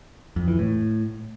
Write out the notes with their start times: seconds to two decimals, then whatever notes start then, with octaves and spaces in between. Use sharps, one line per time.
0.36 F2
0.48 E3
0.59 A2